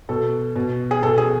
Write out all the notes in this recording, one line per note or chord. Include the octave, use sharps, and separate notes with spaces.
B2 A4
B2
G#4
B2 A4
G#4